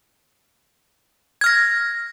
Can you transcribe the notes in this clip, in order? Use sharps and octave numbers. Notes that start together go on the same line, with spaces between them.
F6 G#6 A#6